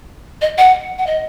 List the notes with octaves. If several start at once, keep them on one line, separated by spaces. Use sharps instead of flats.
D#5
F#5
F#5
D#5